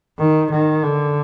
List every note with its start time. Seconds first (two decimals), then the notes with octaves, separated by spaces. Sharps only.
0.19 D#3
0.51 D#3
0.83 D3